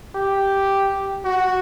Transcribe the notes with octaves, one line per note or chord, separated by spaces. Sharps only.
G4
F#4